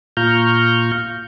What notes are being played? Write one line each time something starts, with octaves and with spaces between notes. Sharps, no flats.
A#2 F4 A#5 C#6 F6 G6